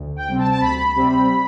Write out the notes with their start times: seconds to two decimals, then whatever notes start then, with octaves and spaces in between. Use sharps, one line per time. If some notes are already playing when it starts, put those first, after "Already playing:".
Already playing: D2
0.16 G5
0.28 C3 G3 C4
0.39 A5
0.52 A5
0.61 D2 B5
0.94 C3 G3 C4